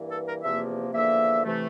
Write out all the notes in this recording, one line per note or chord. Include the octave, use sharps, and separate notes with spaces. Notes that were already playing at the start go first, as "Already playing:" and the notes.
Already playing: G2 E3 A#3
A4
A#4
E2 C3 F3 A#3 E5
E2 D3 F3 A#3 E5
C3 E3 A3